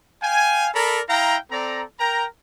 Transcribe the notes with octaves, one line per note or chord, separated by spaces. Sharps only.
F5 G5 G#5
A4 A#4 D5 A#5 B5
E4 F5 G5 A#5
C4 A4 D5 A#5
A#4 G5 A#5